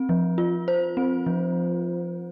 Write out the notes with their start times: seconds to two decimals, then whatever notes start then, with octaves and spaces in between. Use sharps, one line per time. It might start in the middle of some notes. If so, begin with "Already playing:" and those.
Already playing: C4
0.09 F3
0.38 F4
0.68 C5
0.97 C4
1.26 F3